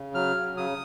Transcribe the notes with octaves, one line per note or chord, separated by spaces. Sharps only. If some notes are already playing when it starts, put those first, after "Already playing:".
Already playing: C#3
F#3 F6
C#3
C#3 D#6